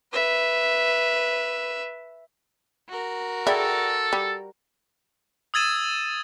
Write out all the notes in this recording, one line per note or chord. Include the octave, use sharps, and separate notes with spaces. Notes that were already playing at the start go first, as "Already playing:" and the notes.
B4 E5
F#4 A#4
E4 G#4 A4 D5 G5
G3
D#6 E6 G#6 A6 D#7 E7